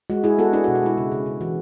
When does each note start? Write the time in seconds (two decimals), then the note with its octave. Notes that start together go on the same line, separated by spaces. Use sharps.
0.10 G#3 F#4
0.24 G#3 E4 G#4
0.39 B3 F#4 A4
0.53 D4 E4 G#4
0.64 F#4
0.68 B2
0.75 F#4
0.83 G#3 E4
0.98 C#3
1.12 C#3
1.26 C#3
1.41 E3 F#4